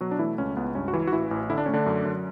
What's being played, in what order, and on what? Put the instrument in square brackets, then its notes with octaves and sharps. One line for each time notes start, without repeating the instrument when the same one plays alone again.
[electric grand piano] B2 F#3 F#4
D4
E3 A3 E4
C#2 C#4
C#2 B3
G2 C#4
F#4
E3 E4
F#4
A1 E3 E4
A1
D3 E4
D4
A3 C#4
D3 D4
F#2
F#2